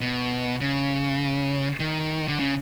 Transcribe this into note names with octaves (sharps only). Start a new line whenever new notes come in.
B2
C#3
D#3
D3
C#3